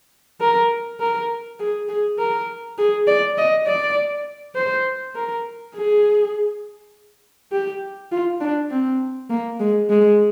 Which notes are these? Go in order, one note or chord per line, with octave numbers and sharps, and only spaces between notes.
A#4
A#4
G#4
G#4
A#4
G#4
D5
D#5
D5
C5
A#4
G#4
G4
F4
D4
C4
A#3
G#3
G#3